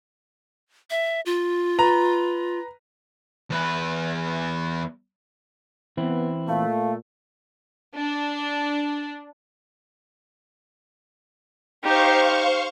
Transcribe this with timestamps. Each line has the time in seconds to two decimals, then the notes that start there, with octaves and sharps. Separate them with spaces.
0.90 E5
1.26 F4
1.78 B4 A#5
3.50 E2 B4
5.97 E3 B3 C4 E4
6.48 A#2 A3 F5
7.93 D4
11.83 D#4 G4 C5 F5 C#6